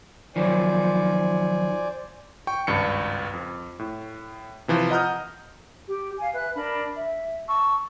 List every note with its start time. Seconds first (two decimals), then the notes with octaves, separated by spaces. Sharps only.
0.36 D#3 F3 F#3 C5 D5 G#5
2.47 G5 C#6
2.67 G#1 C#2 G2 C#7
3.33 F2
3.79 A2
4.68 C3 E3 F3
4.90 D#5 F#5 A#5 D#6 F6 G6
5.88 G4
6.18 F5 G#5
6.34 B4 E5 F#6
6.54 D4 A#4 B5
6.97 E5
7.47 A5 C#6 E6